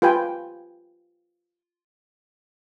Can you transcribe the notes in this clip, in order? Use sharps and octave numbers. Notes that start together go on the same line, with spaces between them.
F4 G4 B4 G5 G#5